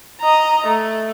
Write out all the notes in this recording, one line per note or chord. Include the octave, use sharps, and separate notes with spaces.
D#5 A#5
A3